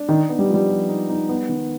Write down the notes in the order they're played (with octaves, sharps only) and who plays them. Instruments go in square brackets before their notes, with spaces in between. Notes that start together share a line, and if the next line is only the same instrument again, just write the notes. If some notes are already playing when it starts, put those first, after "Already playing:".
Already playing: [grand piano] D4
[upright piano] D#3 [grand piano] D#4
[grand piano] B3
[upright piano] G3
[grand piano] F3
[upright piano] G3
[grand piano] F3
D#4
D#4
B3
D#3